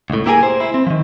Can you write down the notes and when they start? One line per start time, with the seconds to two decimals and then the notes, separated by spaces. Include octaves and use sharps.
0.10 C#2 A2
0.26 A#3 E4 G4 G#4 A#4 G#5
0.43 C5
0.60 E4
0.74 C4
0.87 D#3 F3